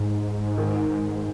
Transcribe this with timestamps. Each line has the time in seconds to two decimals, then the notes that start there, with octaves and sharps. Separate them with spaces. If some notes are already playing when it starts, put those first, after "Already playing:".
Already playing: G#2
0.58 D#3